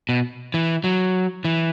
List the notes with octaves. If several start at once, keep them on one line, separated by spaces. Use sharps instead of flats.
B2
E3
F#3
E3